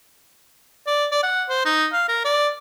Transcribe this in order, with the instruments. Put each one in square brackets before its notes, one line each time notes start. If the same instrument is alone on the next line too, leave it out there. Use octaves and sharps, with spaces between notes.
[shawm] D5
D5
F#5
C5
D#4
F5
A#4
D5